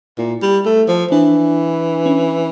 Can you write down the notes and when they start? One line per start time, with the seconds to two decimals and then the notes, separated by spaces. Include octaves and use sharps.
0.18 A#2 E4
0.42 G3
0.66 A3
0.88 F3
1.11 E3 D4
2.06 C#4